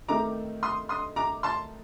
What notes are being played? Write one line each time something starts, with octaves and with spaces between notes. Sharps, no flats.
D#3 A3 C4 D#4 A#5 D6
C6 D#6
C6 D#6
A#5 D6
A5 C6